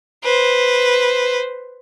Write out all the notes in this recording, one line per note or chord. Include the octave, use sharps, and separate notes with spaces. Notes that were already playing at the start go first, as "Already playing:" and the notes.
B4 C5